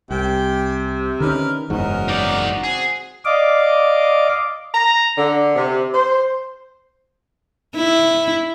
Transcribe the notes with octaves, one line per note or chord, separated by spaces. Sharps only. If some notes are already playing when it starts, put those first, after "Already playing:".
C2 C3 G4 G5 G#5
D3 D#3 C#4 A#4 B4 F6
F#1 E2 G#2 C#4 F#4 A#4 D#5
D#4 D5
C4 G#4
D5 D#5 F5 D6
A#5
D3
C3
C5
E4